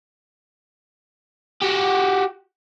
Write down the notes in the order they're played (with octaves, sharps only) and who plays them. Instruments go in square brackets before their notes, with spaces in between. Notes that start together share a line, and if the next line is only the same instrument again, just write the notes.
[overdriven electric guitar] F#4 G4